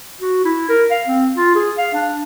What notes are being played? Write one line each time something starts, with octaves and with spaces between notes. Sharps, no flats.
F#4
E4
A#4
F5
C4
F4
G#4
F5
D4